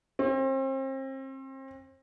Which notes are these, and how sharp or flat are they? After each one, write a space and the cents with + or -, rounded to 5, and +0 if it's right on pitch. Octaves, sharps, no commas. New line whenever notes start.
C4 +35